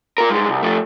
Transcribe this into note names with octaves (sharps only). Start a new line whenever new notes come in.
F4 A#4
G2 G#3
C2
F3 A3